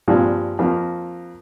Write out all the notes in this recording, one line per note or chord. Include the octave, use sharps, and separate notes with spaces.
G2 A#2 F3 G3 G#3
F2 F3 A#3